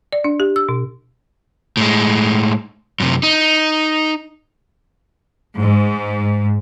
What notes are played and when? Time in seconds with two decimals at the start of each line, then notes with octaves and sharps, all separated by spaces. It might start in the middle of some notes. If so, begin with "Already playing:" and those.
0.13 D5
0.24 D4
0.40 G4
0.56 E6
0.69 B2
1.77 A2 G#3
3.00 F#2 C3
3.23 D#4
5.59 G#2